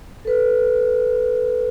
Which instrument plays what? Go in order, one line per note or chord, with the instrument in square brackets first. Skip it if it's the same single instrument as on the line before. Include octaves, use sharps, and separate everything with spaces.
[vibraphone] A4 B4